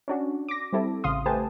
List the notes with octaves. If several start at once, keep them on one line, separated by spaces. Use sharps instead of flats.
C#4 D4 F#4
D6 A#6
G3 C4 E4 A4
A1 C#3 F5 C6 D#6
A3 G4 B4 C5 G#5 A5